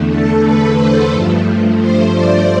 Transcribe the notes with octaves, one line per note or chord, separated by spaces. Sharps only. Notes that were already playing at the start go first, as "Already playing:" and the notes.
Already playing: E2 D3 A3
A4
B4
C5
G2 F3 A3
C5
D5